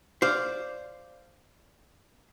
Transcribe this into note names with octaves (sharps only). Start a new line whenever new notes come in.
C5 D5 F5